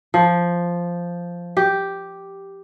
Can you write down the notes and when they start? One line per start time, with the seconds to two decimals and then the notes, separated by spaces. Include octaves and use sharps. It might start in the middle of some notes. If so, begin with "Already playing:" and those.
0.14 F3
1.57 G4